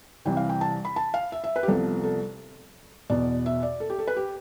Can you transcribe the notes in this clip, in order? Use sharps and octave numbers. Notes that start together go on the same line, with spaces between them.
C2 C3 E3 G3 G5
F5
G5
A5
B5
A5
F5
E5
E5
B4
G4
C2 C3 F3 B3 A4
A4
E2 B2 B3 D5
E5
D5
A4
G4
A4
B4
G4